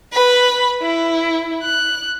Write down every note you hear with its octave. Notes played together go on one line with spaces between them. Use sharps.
B4 B5
E4
F#6